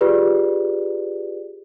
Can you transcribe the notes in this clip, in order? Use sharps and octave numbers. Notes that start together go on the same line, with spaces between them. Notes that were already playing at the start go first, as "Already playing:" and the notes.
F4 G4 G#4 B4 D5